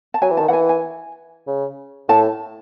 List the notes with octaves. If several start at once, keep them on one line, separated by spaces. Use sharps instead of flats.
A5
F#3 G#5
E3
A5
D#3
E3 F#5 G#5
G#5
C#3
A2 A5